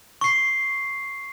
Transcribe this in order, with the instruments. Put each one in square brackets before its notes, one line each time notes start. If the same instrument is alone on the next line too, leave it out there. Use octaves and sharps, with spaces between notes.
[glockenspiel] C#6 C7